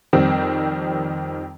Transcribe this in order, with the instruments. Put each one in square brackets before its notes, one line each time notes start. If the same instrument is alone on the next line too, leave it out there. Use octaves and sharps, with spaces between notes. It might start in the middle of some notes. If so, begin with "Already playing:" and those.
[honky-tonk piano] F2 D#3 G3 C4